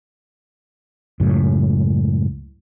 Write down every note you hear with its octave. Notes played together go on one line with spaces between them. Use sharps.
C#2 F#2 A2